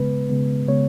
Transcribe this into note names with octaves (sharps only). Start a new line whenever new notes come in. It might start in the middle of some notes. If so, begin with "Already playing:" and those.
Already playing: C#3 G#3 B3 B4
C#3 G#3 B3
C#3 G#3 B3 C#5